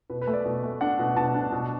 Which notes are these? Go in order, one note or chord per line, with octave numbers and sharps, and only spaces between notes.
B2 B4
B4
A3
D5
B2
A3
D4 F#5
B2
B2 A5
D4
B2